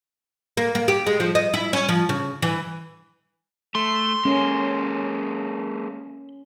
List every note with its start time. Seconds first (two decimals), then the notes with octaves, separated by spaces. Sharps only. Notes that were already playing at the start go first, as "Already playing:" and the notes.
0.57 A#3
0.75 A#3
0.88 G4
1.06 G#3
1.20 F3
1.35 D#5
1.54 E4
1.73 C#4
1.89 F3
2.09 C#3
2.42 E3
3.75 A3 C6
4.25 G#3 A#3 C#4